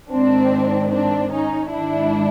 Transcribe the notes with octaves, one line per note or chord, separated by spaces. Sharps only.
G#2 D#3 C4 D4
C4 D4
C#4 D#4
G#2 D#3 D4 E4